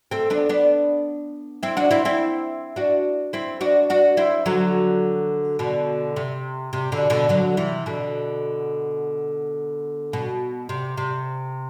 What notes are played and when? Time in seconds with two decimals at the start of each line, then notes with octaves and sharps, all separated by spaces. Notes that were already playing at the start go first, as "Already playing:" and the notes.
0.11 A3 C4
0.30 B3 D4
0.49 B3 D4
1.63 C4 E4
1.77 D4 F#4
1.91 C4 E4
2.05 C4 E4
2.76 D4 F#4
3.33 C4 E4
3.61 D4 F#4
3.90 D4 F#4
4.17 C4 E4
4.46 D3 F#3
5.59 B2 D3
6.16 C3
6.73 C3
6.92 B2 D3
7.10 B2 D3
7.29 D3 F#3
7.57 C3 E3
7.86 B2 D3
10.13 B2
10.69 C3
10.97 C3